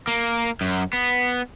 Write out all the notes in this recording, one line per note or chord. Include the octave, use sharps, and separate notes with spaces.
A#3
F#2
B3